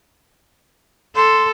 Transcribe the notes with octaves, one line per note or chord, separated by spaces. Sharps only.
A4 C6